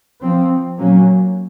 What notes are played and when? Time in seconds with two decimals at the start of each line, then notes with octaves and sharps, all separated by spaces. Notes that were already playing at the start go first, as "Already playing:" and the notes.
0.22 F3 C4
0.78 A#2 F#3 A#3 C#4